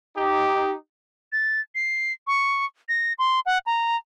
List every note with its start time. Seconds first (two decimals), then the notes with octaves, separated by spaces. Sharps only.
0.17 D#4 G4
1.33 A6
1.75 C7
2.27 C#6
2.89 A#6
3.19 C6
3.46 F#5
3.66 A#5